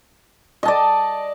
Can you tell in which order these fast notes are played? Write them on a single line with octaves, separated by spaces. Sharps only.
D#5 A5 D5